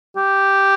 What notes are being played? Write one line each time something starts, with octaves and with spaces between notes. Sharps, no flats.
G4